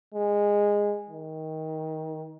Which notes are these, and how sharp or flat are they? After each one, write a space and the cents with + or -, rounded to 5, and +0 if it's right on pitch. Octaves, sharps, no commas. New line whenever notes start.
G#3 -15
D#3 +20